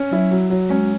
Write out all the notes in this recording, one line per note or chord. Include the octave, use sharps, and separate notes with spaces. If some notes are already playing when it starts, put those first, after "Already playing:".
Already playing: C#4
F#3 E4
F#3
F#3
G#3 C#4